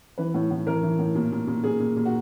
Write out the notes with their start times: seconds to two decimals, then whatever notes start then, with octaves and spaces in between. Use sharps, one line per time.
0.18 E3 B4
0.34 A2
0.51 A2
0.67 E3 A#4
0.83 E3
0.99 A2
1.15 A#2
1.32 A#2
1.47 A#2
1.64 A#2 G#4
1.80 A#2
1.97 A#2
2.06 F#4